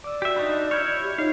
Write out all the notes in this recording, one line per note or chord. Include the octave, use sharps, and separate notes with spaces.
D5 D6 E6
F#4 G4 E5
D4 D#4 B5 C#6 D6
E4 C#5 F6 G6 G#6
G4
D#4 F4 C#5 F5